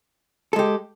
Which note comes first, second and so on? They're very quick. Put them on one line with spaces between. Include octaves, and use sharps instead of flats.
A4 G#3 G4